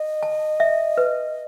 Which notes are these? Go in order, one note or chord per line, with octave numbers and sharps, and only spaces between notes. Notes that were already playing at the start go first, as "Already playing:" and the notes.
Already playing: D#5
A5
E5
B4